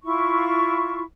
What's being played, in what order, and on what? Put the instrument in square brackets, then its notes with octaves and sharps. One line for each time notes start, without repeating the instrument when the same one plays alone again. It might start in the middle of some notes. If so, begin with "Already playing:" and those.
[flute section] E4 F4 C#6